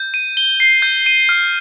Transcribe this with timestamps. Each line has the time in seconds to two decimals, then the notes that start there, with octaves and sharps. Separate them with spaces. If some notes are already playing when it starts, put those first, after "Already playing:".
Already playing: G6
0.14 D#7
0.37 G7
0.60 C7
0.82 G6
1.06 D#7
1.29 F6